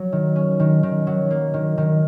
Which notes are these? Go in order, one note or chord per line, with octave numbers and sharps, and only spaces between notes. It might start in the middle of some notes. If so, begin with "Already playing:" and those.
Already playing: F#3
D#3
C#4
D#3
D#3
F#3
A#3
D#3
D#3